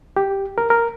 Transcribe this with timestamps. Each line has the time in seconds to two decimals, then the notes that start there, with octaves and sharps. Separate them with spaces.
0.17 G4
0.58 A#4
0.70 A#4